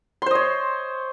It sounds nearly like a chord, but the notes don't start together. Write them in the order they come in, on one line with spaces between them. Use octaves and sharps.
C6 C5 D#5 C#5